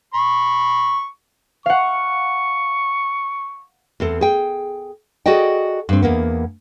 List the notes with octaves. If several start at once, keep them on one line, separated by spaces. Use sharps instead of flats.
B5 C#6
F5 F#5 C#6
E2 C4 A4
G#4 G5
F#4 G#4 A4 D5 D#5 G5
G2 C4
E2 A#3 B3